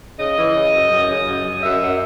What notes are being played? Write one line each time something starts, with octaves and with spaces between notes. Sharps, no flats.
C#3 D#5
E3
C#3
F#2
F#2
C#3
F#2
F#2
F#2 E5
F#2